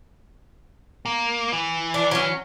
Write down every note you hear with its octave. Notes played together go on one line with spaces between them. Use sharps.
A#3
E3
D4
F#3 C#4